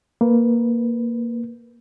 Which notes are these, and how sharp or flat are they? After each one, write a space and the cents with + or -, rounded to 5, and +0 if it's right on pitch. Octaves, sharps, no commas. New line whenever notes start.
A#3 +0 B4 +0